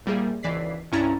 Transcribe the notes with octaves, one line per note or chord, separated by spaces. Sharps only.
A#1 G3 A#3 G#4 E5
G#1 C#2 E3 D5 B6 C7
C2 G2 C#4 E4 A#5 A6